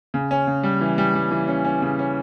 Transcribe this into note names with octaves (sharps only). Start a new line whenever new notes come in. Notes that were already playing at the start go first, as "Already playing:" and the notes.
C#3
C#4
C#3
G3
E3
G3
G3
E3
C#4
C#4
C#3
C#4